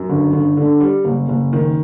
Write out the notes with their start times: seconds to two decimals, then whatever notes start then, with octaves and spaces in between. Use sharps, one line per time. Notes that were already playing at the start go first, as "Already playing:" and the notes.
Already playing: F#2
0.10 G1
0.33 G1
0.57 D3
0.80 G3
1.05 F#1
1.29 F#1
1.53 D#3